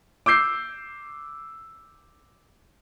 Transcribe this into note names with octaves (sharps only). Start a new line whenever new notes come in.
D6 E6 G6 C7